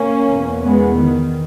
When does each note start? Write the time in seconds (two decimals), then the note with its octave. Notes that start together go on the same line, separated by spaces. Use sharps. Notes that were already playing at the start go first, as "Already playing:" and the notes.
Already playing: A#3 C#4
0.28 E2 B2
0.62 G#3 B3
0.97 D#3